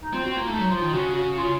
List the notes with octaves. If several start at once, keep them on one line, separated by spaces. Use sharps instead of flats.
D#4
C4 F4
C4 F#4
A#3 F4
A3 D#4
F#3
F3 F4
D#3
C#3 F#4
F#4
F4